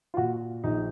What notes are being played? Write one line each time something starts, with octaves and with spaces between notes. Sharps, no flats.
F4
A#2 F#4
A#1 D#4